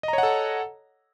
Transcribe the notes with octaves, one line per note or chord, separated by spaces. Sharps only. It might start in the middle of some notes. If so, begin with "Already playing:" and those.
A4 C#5 D#5 F#5 A#5